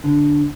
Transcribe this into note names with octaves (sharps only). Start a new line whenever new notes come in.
D3